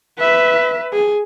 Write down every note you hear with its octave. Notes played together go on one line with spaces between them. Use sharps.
B4 E5
G#4